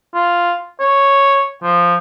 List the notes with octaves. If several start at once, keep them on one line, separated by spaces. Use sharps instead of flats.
F4
C#5
F3